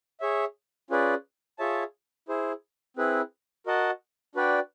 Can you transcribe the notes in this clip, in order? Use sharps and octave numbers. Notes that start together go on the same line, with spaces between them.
G#4 C#5 E5
C#4 F4 G#4 B4 D5
F4 G#4 C#5 E5 A5
E4 G#4 C5
C4 E4 G#4 B4
F#4 A#4 D#5 F#5 A5
D4 F#4 B4 D5 G5